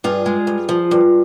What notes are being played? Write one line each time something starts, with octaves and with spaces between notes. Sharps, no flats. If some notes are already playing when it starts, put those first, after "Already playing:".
G2 F4 G#4
G#3
G2
F3
G2